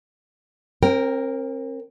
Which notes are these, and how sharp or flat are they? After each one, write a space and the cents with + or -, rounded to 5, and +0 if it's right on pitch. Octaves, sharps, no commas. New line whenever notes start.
C4 +35 A#4 +0 G5 +0